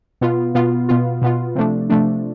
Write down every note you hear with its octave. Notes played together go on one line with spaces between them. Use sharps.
B2 B3 F4
B2 B3 F4
B2 B3 F4
B2 B3 F4
C3 F3 A3 D4
C3 F3 A3 D4